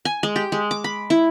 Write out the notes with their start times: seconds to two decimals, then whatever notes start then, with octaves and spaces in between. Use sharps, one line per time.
0.05 G#5
0.23 G#3
0.36 G4
0.52 G#3
0.71 D6
0.84 B5
1.10 E4